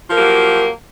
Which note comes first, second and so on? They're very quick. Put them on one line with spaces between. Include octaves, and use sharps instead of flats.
F3 A#4 A#3 G4 F#3